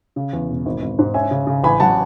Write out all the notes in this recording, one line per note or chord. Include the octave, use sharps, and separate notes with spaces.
C#3
E2
E1
G#1
G#1
G#2
C#4 E5 G#5
C#3
C#3
A1 G#5 B5
F#3 F#5 A5